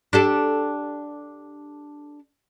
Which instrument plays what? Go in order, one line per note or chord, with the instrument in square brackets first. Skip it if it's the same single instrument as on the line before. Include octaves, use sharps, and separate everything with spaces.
[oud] D4 G4 A4